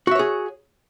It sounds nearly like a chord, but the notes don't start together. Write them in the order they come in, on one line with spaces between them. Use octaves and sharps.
F#4 E5 C#5 G#4